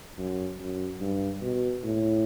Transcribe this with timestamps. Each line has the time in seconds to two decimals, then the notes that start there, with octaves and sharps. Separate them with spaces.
0.18 F#2
0.59 F#2
1.00 G2
1.42 B2
1.83 A2